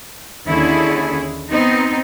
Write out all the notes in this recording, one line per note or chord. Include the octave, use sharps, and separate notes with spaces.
D#2 D3 C#4 E4 G#4
B3 C4 D#4